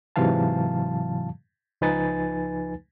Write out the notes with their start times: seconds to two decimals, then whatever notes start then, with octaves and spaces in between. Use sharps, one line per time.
0.16 G#2 C3 E3 F#3 F5 A5
1.81 C#2 F3 D#4 B4 G#5 A6